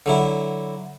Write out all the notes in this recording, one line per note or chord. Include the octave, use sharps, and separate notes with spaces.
D3 F#3 E4